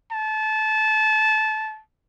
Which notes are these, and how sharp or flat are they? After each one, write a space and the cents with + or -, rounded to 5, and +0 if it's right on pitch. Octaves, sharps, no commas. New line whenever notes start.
A5 -20